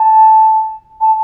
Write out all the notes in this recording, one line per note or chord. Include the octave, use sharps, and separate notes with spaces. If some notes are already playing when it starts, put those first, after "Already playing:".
Already playing: A5
A5